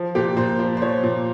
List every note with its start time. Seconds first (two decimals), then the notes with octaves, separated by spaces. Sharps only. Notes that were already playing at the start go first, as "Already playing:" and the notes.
Already playing: F3
0.15 A#2 G4
0.37 A#2 C5
0.59 F3 C5
0.77 C5
0.82 F3 C#5
1.03 A#2